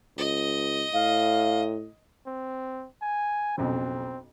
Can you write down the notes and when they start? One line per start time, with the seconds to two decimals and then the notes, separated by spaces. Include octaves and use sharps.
0.17 C#2 D#5
0.94 A2 F5
2.27 C4
3.02 G#5
3.58 B1 F2 C#3 C4